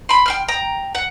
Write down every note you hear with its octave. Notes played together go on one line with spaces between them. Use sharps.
B5 C6
G5 C6 F6
G5 A#5
F#5